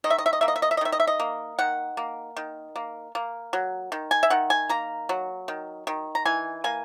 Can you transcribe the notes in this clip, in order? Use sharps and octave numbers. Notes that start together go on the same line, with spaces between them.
D#3 D#5
E5
D#5
E5
D#5
A#3 E5
D#5
E5
D#5
E5
D#5
D#3 E5
D#5
E5
D#5
A#3
D#3 F#5
A#3
D#3
A#3
A#3
F#3
D#3
G#5
E5
D#3 F#5
G#5
A#3 A#5
F#3
D#3
D#3
A#5
E3 G#5
A#3 G#5